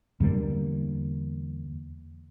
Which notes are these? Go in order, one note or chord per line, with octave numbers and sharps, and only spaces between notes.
E2 D3 G3 A#3